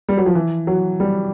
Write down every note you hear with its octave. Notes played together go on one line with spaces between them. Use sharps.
G3
F#3
F3
E3
F#3
G3